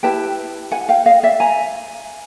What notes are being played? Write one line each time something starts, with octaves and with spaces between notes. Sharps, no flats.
E4 G4 B4 G5 A5
F#5 G#5
F5 G5
D#5 F5
D5 E5
G#5 A#5